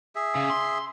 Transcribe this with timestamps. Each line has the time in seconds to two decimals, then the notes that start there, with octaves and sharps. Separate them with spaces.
0.15 G#4 E5
0.35 C#3
0.50 C6